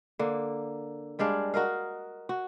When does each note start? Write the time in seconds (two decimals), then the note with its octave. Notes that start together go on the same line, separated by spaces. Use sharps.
0.19 D3 A#3
1.19 G3 G#3 D4 F5
1.54 F#4 A#4 D#5 F5
2.29 F#4